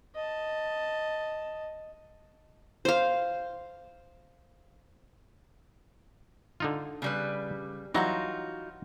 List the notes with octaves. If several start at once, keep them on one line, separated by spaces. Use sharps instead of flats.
D#5 A5
C5 F5
D3 D#4 F4
C#3 G3 B4
E3 F#3 G3 D#4 F4 F#4